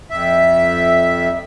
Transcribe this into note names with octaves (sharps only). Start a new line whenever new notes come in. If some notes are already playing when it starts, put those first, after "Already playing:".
F2 E5